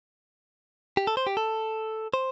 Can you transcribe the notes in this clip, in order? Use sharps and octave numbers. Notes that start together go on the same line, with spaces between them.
G4
A4
C5
G4
A4
C5